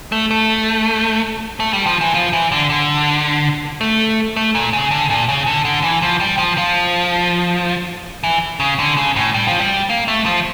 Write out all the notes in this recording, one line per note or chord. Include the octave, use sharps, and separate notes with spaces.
A3
A3
A3
G3
F3
E3
F3
E3
D3
D3
A3
A3
A#2
C#3
D3
A#2
C#3
D3
D3
E3
F3
G3
F3
F3
E3
C#3
D3
C#3
A2
G3
F3
G3
A#3
A3
F3